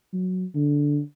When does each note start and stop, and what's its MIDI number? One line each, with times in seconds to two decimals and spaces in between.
0.13 0.45 54
0.55 1.00 50